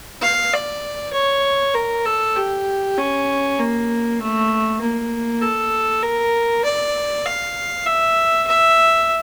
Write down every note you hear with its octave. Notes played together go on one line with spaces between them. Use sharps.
F5
D5
C#5
A#4
A4
G4
C#4
A#3
A3
A#3
A4
A#4
D5
F5
E5
E5